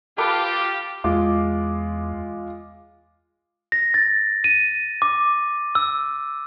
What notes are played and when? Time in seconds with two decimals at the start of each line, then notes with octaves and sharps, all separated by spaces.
0.18 F4 G4 A4 B4 D6
1.04 E2 G#3 F4 D6
3.72 A#6
3.94 A6
4.44 D#7
5.02 D6
5.75 E6